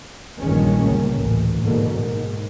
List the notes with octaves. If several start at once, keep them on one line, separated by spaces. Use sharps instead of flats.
A#1 G2 A#2 D#3 G#3 C#4
G1 C#2 A#3
A1 D2
G#2 B2 D3 A#3
G#2